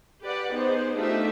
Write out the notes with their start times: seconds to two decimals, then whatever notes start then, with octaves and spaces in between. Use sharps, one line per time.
0.23 G4 B4 D5 F#5
0.52 B3 D#4 G#4 C5
0.95 A3 D4 D#4 F4 G4 E5